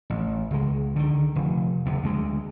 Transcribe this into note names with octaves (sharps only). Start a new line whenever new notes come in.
A1
C#2 G#3
D3 D#3
F1
F#1 E2
D2 G#3